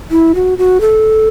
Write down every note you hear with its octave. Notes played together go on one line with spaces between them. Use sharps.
E4
F#4
F#4
A4